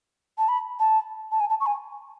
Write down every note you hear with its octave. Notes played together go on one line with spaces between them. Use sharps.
A5
B5
A5
A5
G#5
A5
C#6
G#5